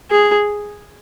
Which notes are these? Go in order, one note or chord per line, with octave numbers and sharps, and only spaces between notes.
G#4